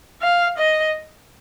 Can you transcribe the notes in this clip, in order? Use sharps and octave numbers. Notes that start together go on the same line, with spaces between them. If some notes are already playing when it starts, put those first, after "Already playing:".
F5
D#5